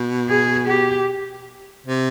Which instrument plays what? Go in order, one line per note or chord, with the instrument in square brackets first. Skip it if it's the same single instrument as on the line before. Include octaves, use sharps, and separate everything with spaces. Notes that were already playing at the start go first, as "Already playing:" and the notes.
Already playing: [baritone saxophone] B2
[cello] G#4
G4
[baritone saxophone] C3